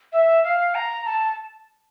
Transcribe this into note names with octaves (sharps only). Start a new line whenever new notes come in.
E5
F5
A#5
A5